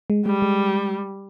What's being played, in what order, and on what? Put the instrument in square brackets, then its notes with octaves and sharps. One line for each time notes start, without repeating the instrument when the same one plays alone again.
[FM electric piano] G#3
[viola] G3 [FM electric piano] G#3
[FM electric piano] G#3